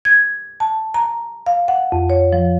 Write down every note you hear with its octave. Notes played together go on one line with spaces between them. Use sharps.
G#6
A5
A#5
F5
F#5
F2
C#5
F3